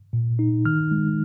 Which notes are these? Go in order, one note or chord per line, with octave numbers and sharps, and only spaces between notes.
A#2
D#4
D#3 F6
G#3